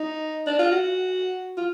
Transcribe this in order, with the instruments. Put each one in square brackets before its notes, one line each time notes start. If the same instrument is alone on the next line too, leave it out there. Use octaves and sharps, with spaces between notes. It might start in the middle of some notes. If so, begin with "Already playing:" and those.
Already playing: [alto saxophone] D#4
D4
F4
F#4
F4